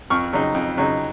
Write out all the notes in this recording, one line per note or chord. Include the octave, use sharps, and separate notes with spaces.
F2 C#6 F6
C#3 F#3 C4 D#4
F2
C#3 F#3 C4 D#4